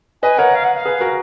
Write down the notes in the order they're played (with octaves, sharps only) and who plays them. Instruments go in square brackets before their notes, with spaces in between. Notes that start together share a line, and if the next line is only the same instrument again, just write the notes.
[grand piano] B4 D#5 [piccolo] G#5
[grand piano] A#4 C#5 [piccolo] F#5
[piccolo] F5
F#5
F5
[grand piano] G#4 B4
F#4 A#4